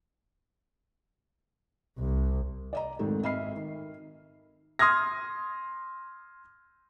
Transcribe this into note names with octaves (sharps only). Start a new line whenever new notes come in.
C2
D5 D#5 A#5
F2 G#2 D#3 A3 C4
G#1 D#5 E5 B5 F6 C7
D#3
C6 D#6 F6 G#6 A#6